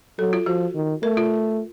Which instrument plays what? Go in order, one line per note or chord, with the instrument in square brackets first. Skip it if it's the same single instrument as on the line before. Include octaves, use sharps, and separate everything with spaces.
[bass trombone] F#3 [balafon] A4
[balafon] F4
[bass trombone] F3 [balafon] F#4
[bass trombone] D#3
[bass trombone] A3 [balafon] A#4
[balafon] F4